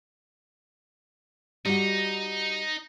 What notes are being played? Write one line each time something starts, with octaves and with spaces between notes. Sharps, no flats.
G3 D#4 F#4